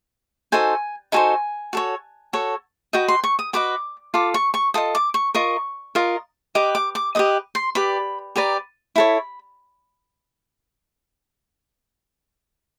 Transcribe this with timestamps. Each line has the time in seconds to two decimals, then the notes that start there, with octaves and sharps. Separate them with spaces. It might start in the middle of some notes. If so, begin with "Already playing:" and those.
0.52 D#4 F#4 A4 C5 G#5
1.12 D#4 F#4 A4 C5 G#5
1.73 F#4 A4 C#5
2.33 F#4 A4 C#5
2.93 F#4 B4 D#5 G5
3.08 C6
3.24 C#6
3.39 D#6
3.53 F#4 B4 D#5 D6
4.14 F4 A4 D6
4.34 C#6
4.54 C#6
4.74 F4 A4 D#5 D#6
4.95 D6
5.14 C#6
5.35 F4 A#4 D#5 C#6
5.95 F4 A#4 D#5
6.55 G4 B4 D#5 D6
6.75 D6
6.95 D6
7.15 G4 B4 D#5 D#6
7.55 C6
7.75 G4 B4 D5 B5
8.36 G4 B4 D5 A#5
8.96 E4 A4 C#5 B5